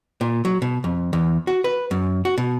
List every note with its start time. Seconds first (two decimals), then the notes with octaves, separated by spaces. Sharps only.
0.21 A#2
0.45 F#3
0.62 B2
0.84 F2
1.13 E2
1.47 F#4
1.64 B4
1.91 F#2
2.25 F#4
2.38 B2